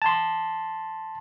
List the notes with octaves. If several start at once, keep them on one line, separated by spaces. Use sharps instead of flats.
A5 C6